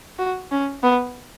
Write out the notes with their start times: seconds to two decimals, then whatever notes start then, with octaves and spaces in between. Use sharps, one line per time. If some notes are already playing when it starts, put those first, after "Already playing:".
0.19 F#4
0.51 C#4
0.83 B3